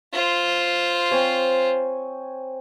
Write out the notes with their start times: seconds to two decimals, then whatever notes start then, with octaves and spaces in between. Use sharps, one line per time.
0.13 F4 C5
1.11 C4 C#5 G#5